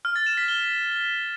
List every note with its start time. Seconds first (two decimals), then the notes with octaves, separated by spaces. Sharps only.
0.05 F6
0.16 A6
0.27 E7
0.37 B6
0.48 G7